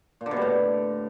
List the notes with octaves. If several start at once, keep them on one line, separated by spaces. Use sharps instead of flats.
A#2
D3
B2
G3
A2